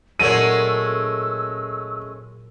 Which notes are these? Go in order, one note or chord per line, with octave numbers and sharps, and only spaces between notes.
A#2 F#3 G#3 A3 C#4 E6 D#7